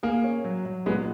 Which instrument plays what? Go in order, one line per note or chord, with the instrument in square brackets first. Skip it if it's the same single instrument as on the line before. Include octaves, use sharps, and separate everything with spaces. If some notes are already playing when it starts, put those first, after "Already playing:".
[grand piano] A#3 [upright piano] G#4
[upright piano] C#4
F#3
F#3
[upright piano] A#2 [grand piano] G#3 B3